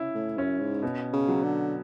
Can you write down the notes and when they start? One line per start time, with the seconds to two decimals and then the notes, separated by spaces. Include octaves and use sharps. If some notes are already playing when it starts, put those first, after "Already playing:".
Already playing: C#3 C#4 E4
0.15 A2
0.37 F#2 C#4
0.60 G#2
0.82 B2
1.13 C#3
1.28 F#3
1.43 D3